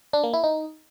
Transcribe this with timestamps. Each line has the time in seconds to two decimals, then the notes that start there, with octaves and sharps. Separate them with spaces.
0.13 D4
0.23 A#3
0.34 E4
0.44 D#4